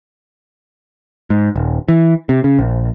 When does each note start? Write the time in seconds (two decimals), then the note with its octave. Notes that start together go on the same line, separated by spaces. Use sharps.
1.30 G#2
1.56 D#1
1.89 E3
2.29 C3
2.44 C#3
2.59 A#1